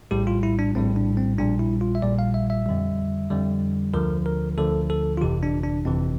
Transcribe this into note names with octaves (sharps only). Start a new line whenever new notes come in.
A#1 A2 G3 G4
F4
E4
D4
A#1 A2 G3 C4
D4
C4
A#1 A#2 G3 D4
E4
F4
E5
A#1 A#2 G3 D5
F5
E5
E5
F2 D3 G3
F2 D3 G3
D2 D3 F3 A#4
A#4
D2 D3 F3 A4
A4
F4
G1 F2 C3 E3 G4
D4
D4
G1 F2 C3 E3 C4